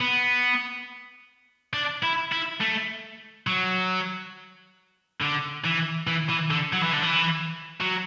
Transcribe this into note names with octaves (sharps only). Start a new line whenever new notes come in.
B3
D4
E4
E4
A3
F#3
D3
E3
E3
E3
D3
F#3
E3
D3
E3
F#3